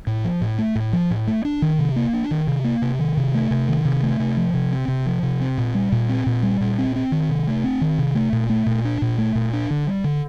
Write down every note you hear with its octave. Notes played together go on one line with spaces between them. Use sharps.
A2
F3
A2
A3
A2
F3
A2
A3
D4
D#3
C3
A#3
D4
D#3
C3
A#3
C3
D#3
C3
A3
C3
D#3
C3
A3
C3
F3
C3
C4
C3
F3
C3
C4
A#2
G3
A#2
C4
A#2
G3
A#2
C4
C4
D#3
C3
A3
C4
D#3
C3
A3
A#2
A3
A#2
D4
A#2
A3
A#2
D4
D3
G3
D3